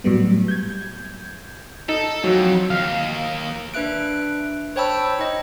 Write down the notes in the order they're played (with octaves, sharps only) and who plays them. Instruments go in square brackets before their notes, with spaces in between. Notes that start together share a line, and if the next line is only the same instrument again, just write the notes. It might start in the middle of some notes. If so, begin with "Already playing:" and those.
[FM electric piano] A2 F#3 G3 B3
G6 G#6
[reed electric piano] D#4 [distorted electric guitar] A4
[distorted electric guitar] F2 [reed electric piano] F#3
[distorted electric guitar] D#2 [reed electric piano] F5
[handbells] D4 B4 E5 F#6 D7
C5 C#5 G5 A5 B5 E6
D#4 D#5